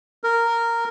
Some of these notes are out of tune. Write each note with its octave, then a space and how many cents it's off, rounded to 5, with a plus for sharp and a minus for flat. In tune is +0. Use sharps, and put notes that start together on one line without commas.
A#4 -10